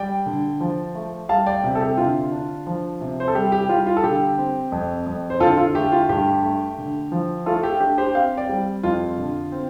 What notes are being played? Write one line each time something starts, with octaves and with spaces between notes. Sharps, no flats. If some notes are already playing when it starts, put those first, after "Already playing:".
Already playing: G3 D5 G5
D3
F3
A3
G3 F5 A5
D5 G5
C3
A4
G4
D3 F4
D4
F3
C3
C5
A4
G3 G4
G4
G3 F4
F4
A4
D3 G4
C4
F2
F2
C5
D3 F4 A4
F4
A3 G4
F4
G2 G4
A3
D3
F3
A3 F4 A4
G4
D4 G4
G4 C5
C4 C5 F5
D5 G5
G3
F2 F4
D3
C4